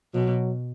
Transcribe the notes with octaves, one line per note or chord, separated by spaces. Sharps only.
B2 F#3